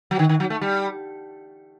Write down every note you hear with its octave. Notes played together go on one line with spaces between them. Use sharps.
F#3
D#3
D#3
F#3
A3
G3